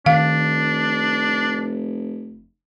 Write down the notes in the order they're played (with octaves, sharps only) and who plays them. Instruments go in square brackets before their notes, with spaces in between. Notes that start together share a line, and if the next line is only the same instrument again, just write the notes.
[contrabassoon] F1 [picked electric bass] D#3 [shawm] D4 [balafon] F5